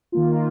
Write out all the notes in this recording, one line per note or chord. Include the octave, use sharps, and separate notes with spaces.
D#3 A#3 F4